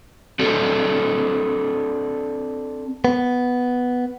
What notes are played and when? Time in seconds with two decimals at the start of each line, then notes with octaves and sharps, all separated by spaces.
0.39 C4 D4 F#4 A4
3.05 B3